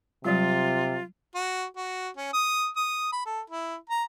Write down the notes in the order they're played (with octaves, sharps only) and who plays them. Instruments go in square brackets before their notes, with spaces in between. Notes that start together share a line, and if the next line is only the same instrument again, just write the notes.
[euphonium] C3 [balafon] F#3 G3 [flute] F4
[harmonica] F#4
F#4
C#4
D#6
D#6
B5
A4
E4
A#5